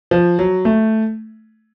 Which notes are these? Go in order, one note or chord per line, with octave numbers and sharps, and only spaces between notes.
F3
F#3
A3